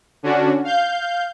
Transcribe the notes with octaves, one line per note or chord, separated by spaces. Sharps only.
D3 C#4 D4 F#4
F5 G6